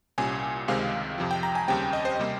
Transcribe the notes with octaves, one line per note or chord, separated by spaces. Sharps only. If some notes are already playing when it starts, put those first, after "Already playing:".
C2 A#2 G3 C#4 G#5
C#2 C3 D#3 G#3 C4 F5
F2 C3 F3
G5
A#5
G#5
D#2 C#3 G3 C4 G5
D#5
C5
C3 G3 A#3